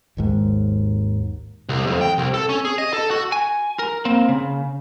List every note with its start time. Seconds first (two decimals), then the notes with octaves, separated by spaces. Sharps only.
0.17 G#1 D#2 G#2
1.69 C2
1.86 F2
2.01 G5
2.18 C2
2.34 A4
2.49 C#4
2.65 G#4
2.78 D#5
2.93 A4
3.11 F#4
3.32 G#5
3.79 A#4
4.05 A#3 C4
4.29 C#3